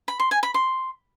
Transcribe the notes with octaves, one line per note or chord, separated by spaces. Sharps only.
B5
C6
G#5
B5
C6